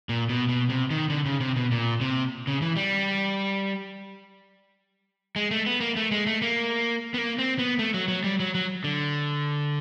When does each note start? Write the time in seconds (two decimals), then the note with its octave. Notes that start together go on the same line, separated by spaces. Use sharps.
0.09 A#2
0.29 B2
0.49 B2
0.70 C3
0.90 D#3
1.10 D3
1.26 C#3
1.40 C3
1.56 B2
1.71 A#2
2.01 C3
2.47 C#3
2.62 E3
2.77 G3
5.36 G#3
5.51 A3
5.66 B3
5.80 A#3
5.96 A3
6.12 G#3
6.26 A3
6.42 A#3
7.14 B3
7.18 A#3
7.38 C4
7.59 B3
7.79 A3
7.94 F#3
8.08 F#3
8.24 G3
8.40 F#3
8.55 F#3
8.84 D3